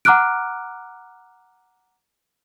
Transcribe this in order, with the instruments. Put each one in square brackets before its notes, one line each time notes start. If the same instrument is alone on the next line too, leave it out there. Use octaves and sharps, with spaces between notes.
[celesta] F#5 A#5 D6 F6 F#6 D7